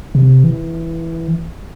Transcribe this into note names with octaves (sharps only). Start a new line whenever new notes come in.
C3
E3